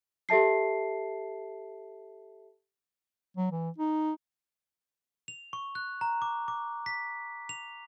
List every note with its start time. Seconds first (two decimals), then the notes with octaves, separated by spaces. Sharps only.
0.29 G4 A4 E5 A5 C7
3.37 F#3
3.51 E3
3.78 D#4
5.28 F7
5.53 C#6
5.75 F#6
6.01 A#5
6.22 D6
6.48 D6
6.86 B6
7.49 F7